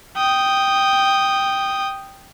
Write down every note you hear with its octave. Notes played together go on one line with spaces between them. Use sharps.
G5 D#6